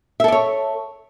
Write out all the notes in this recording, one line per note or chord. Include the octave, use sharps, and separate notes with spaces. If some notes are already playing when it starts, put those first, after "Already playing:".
A4 C#5 D5 E5